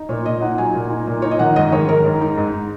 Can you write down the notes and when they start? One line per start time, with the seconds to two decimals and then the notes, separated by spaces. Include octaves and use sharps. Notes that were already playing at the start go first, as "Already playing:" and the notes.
Already playing: D#4
0.09 A#2 C#5
0.26 A#2 D#5
0.41 D#4 F#5
0.58 F#3 G#5
0.75 A#2
0.90 D#4
1.07 A#2
1.22 D#4 C#5
1.31 D#5
1.39 D#3 F#5
1.56 G#2 D#5
1.72 D#3 C#5
1.88 D#3 A#4
2.05 G#2
2.21 D#4
2.37 G#2